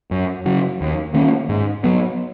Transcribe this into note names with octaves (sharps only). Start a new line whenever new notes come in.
F#2
C#3 F#3
D#2
D#3 A#3 C#4
G#2
F#3 B3